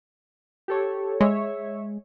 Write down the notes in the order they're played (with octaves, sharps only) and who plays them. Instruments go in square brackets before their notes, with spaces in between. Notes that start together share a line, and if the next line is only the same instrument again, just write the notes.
[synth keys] G4 A4 C#5
[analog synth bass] G#3 [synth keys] C#5 E5